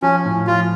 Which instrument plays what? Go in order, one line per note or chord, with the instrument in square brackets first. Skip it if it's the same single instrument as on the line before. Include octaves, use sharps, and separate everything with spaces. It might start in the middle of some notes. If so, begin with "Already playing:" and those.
[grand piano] F3 [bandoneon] C#4
[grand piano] A2
[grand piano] F3 [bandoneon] F4